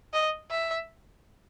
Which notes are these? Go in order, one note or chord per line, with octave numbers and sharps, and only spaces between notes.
D#5
E5